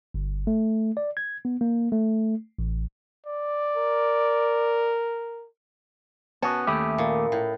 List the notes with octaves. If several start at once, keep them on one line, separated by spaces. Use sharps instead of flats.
G1
A3
D5
G#6
B3
A#3
A3
A1
D5
A#4
B3 C#4 F#4 A5
D#2 A3 G4 E5 B5 D#6
A#2
A2